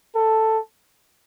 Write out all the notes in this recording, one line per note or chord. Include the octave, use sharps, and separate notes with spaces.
A4